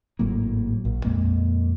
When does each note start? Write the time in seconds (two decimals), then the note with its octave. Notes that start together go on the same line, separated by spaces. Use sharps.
0.19 G#1 A2 F#3 A#3
0.85 A#1
1.05 F2 A#2 G#3 A#3